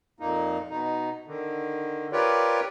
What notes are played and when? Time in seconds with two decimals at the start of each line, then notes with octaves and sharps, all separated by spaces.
0.20 F2 A#2 A#3 D#4
0.70 B2 D#4
1.27 D3 D#3
2.12 F4 G4 A#4 B4 C#5 D5